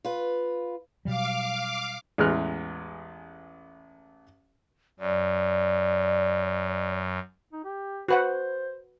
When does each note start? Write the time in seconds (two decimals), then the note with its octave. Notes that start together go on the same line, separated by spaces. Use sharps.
0.05 F4 B4
1.05 B2 F#3 G3 F5 D6
2.18 A1 E2 E3 G#3 F6 F#6
4.99 F#2 D5
7.52 D#4
7.64 G4
8.08 F#4 B4 C5 F#5